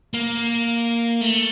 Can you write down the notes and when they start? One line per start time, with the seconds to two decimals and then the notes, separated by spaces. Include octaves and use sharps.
0.14 A#3
1.21 A3